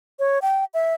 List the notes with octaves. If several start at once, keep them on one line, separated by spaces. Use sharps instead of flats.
C#5
G5
E5